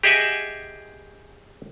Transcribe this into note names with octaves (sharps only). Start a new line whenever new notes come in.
G4 G#4 D#5 E5 F#5 G#5